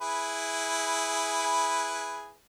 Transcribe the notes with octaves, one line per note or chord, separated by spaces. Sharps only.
E4 G#4 B4